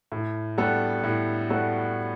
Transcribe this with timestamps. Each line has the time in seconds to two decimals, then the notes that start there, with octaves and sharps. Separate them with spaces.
0.12 A2
0.58 G3 B3 F#4 A4
1.04 A2
1.50 G3 B3 F#4 A4